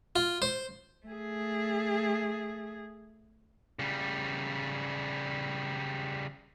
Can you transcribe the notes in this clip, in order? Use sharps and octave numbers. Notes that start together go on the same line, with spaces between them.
F4
C5
A3 G#4
C#3 G3